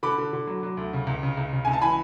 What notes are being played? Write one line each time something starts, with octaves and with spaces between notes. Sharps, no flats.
D3 B5 D6
D3
D3
F#3
F#3
D2
C#3
C#2
C#3
C#2
C#3
C#2 G#5
A5
E3 G#5 B5